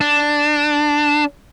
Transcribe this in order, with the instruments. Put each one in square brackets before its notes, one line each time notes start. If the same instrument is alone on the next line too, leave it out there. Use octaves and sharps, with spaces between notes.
[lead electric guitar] D4